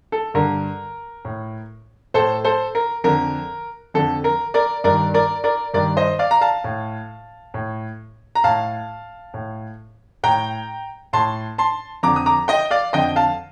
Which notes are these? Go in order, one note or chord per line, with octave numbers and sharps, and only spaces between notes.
A4
G2 D3 A#4
A2
A2 A4 C5
A4 C5
A#4
F2 D3 A#4
F2 D3 A4
A#4
A#4 D5
G2 D#3 A#4 D5
A#4 D5
A#4 D5
G2 D#3 A#4 D5
C5 D#5
D5 F5
A#5
F5 A5
A2
A2
A#5
A2 F5 A5
A2
A2 G5 A#5
A2 A5 C6
A5 C6
F2 D3 A#5 D6
D#6
A#5 D6
D#5 G5
D5 F5
F2 D3 D#5 G5
F5 A5